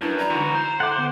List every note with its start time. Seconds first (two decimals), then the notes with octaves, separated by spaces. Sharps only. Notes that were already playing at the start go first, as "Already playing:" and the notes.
0.01 F#2 D4 E4 B4 A5
0.18 D5 A#5 B5
0.30 D3 E3 D#4 F#4 C6
0.54 E4 C5
0.80 A4 E5 F#5 G5 D6
0.97 D3 B3